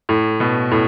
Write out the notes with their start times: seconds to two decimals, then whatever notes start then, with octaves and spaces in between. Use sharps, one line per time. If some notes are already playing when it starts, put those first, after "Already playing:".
0.09 A2
0.40 B2
0.71 A2